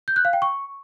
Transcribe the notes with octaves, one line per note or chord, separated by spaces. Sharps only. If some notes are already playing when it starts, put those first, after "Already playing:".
G6
F#6
F5
G5
C#6